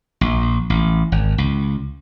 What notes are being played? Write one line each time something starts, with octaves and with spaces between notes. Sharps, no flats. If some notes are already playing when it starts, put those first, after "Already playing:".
A#1
A1
G#1
C#2